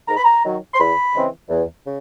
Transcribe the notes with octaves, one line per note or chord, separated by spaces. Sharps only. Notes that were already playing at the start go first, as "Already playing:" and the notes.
G#2 A#5
B5
A#5
D#3 F#3
C6
E2 B5
C#3 E3 G#3 C4
E2
C#3